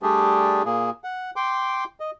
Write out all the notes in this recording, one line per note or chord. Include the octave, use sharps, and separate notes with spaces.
G3 A3 D4 G4 G#4
A#2 A#3 G#4
F#5
G5 C6 D6
D#5